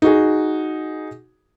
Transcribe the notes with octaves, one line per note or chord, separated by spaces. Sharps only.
D#4 F#4 G#4